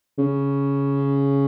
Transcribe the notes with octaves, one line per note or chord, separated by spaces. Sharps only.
C#3